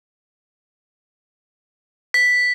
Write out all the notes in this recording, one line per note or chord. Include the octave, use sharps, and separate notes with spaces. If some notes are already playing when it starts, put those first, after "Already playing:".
B6